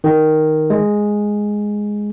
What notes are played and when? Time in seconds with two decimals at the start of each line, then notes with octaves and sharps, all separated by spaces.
0.04 D#3
0.70 G#3